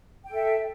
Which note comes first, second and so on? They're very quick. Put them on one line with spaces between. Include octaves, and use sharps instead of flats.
G5 A4 E5